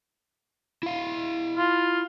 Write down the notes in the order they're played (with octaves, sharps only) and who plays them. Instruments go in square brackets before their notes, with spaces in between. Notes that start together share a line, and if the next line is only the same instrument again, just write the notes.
[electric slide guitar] E4 F5
[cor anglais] F4